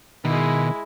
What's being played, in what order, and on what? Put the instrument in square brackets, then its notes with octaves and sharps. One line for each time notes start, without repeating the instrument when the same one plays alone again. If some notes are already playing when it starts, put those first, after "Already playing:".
[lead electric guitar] B2 [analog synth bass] D#3 [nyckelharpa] G#3 E4